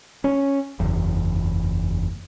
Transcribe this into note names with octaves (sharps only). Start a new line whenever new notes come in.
C#4
F#1 E2